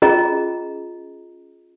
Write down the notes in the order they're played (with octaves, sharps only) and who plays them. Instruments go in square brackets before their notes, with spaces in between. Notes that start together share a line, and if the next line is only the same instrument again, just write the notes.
[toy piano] C#4 F4 G#4 D#5 A#5